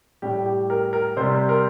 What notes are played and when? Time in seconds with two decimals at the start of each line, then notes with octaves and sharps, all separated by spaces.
0.22 A2 G3 G4
0.46 G4
0.70 A#4
0.93 A#4
1.17 C3 G3 C5
1.49 A#4